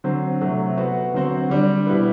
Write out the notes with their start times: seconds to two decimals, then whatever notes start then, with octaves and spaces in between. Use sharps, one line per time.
0.04 D3 F#3 C4 F#4 C5
0.41 C3 F#3 A3
0.77 B3 F#4 C5
1.14 D3 F#3 C4 F#4 C5
1.50 D3 G3 D4
1.87 B2 G3 B3 E4 B4